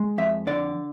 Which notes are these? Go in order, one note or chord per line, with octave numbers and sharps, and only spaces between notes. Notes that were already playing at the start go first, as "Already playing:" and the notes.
Already playing: G#3
F2 E5
D3 D5